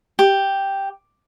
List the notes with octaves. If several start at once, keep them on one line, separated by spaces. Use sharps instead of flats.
G4